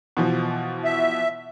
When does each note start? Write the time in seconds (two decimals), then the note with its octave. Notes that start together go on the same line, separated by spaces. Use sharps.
0.17 B2 E3 F3
0.84 E5